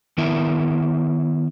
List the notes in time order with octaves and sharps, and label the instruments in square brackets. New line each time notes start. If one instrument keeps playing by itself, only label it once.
[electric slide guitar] D#3 B3 E4 A#4 E5